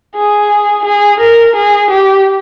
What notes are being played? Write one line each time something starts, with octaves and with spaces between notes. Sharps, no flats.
G#4
G#4
A#4
G#4
G4